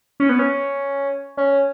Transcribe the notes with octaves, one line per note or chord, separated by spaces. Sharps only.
C#4
B3
C#4
C#4